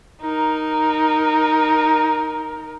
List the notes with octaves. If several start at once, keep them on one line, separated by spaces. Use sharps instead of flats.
D#4 A#4